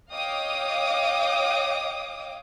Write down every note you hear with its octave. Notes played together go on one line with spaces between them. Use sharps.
C#5 D#5 F5 G5 D6 D#6